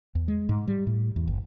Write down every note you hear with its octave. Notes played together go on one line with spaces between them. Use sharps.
E2
G#3
G#2
G3
A2
E2
G1